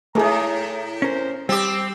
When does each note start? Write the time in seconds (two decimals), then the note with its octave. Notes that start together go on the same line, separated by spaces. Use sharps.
0.15 D#2 A2 A3 G#4 A#5
1.02 C#4 A#4 C5
1.49 G3 C4 G4 E6